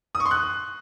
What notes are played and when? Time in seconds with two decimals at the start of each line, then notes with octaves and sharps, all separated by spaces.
0.15 D#6
0.20 C#6
0.26 C6
0.31 F#6